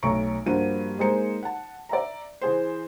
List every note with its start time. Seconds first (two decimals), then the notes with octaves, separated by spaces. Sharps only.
0.03 B1 A3 C#5 A#5 C#6 D7
0.46 G2 F3 A#3 F#4 D#7
0.99 G#3 A#3 D#4 G#4 C5 C#7
1.43 F#5 A5
1.89 D5 E5 A#5
2.41 E3 G#4 C5